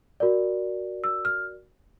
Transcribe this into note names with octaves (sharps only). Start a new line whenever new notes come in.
F#4 A#4 D5
E6
F6